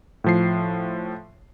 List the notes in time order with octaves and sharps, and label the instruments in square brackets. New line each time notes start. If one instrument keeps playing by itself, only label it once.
[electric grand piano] A2 F3 C7